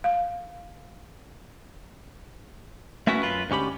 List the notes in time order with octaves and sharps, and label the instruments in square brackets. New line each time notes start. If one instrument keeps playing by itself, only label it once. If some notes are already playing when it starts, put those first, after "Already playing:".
[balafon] F5
[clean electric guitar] A3 B3 C#4 E4 F#4 B4
F#2 F4 B4
D2 G#2 C#4 G4 B5